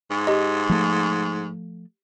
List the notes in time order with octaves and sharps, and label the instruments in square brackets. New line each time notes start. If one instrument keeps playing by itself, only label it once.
[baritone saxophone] G#2
[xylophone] G4 D#5
[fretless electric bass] F3 A3